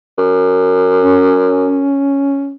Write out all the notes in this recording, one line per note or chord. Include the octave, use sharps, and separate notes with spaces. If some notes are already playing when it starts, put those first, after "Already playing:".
F#2
C#4